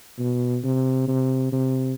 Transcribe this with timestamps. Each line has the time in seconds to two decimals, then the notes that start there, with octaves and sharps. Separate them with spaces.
0.19 B2
0.64 C3
1.08 C3
1.53 C3